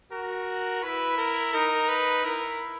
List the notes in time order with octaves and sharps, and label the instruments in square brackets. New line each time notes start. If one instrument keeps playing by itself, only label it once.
[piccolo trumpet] F#4 [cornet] A#4
[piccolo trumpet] E4 [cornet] B4
[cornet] A#4
[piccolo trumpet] D#4 [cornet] A#4
[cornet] B4
[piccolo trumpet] E4 [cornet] A#4